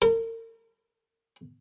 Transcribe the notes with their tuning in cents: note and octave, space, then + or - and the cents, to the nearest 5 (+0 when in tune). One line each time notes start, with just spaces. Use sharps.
A#4 -40